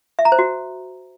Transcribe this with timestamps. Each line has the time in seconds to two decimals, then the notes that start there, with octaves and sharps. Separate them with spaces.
0.19 E5
0.25 A#5
0.32 C5
0.39 F#4